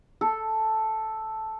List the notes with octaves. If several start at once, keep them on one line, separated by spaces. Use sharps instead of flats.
A4